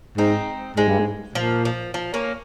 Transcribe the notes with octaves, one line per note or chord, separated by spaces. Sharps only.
G#2 C4 D#4
G#2 G#3
G2
G#2
A#2 F3
F3
F3
A#3 C#4